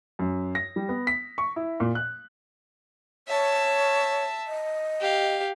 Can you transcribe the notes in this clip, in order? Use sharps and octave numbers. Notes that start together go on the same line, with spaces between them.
F#2
A#6
G3
B3
B6
C#6
E4
A#2
F#6
C#5 E5 A5
D#5
G4 F5